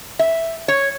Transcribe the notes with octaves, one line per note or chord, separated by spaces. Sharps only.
E5
C#5